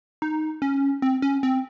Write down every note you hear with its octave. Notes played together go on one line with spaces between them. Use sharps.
D#4
C#4
C4
C#4
C4